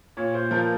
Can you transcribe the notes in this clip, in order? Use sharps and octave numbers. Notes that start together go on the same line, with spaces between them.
A#2 C#5
A#2 C5
F3 A#4